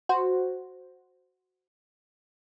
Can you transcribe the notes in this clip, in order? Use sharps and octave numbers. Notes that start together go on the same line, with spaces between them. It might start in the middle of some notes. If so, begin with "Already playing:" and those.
F#4 C5